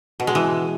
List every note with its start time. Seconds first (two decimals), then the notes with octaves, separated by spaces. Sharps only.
0.20 B2
0.27 G#3
0.35 E3